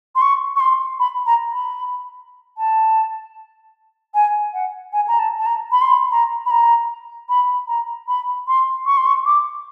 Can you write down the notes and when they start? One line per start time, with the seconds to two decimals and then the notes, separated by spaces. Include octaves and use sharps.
0.15 C6
0.22 C#6
0.56 C#6
0.60 C6
1.00 B5
1.26 A#5
1.52 B5
2.58 A5
4.14 G#5
4.53 F#5
4.93 G#5
5.08 A#5
5.19 A5
5.39 A5
5.46 A#5
5.72 B5
5.82 C6
5.91 B5
6.11 A#5
6.46 B5
6.51 A#5
7.29 B5
7.68 A#5
8.08 B5
8.48 C6
8.86 C#6
8.97 C6
9.07 C#6
9.26 D6